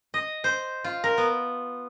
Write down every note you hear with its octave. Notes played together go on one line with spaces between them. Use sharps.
D#5
C5
F4
A#4
B3